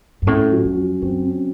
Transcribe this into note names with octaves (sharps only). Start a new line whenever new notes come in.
F#2
A2 C#4
F#3
F2
F#3
F#2 C4
C#4